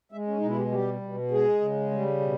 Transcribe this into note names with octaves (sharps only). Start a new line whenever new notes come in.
G#3 E5
C#4
B2 D#4
E4
G4
G3 G4
B2
G#3 G#4
C#3
G3
B2